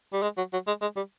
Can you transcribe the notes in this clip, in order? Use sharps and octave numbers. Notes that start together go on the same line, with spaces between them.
G3
G#3
F#3
F#3
G#3
G#3
G3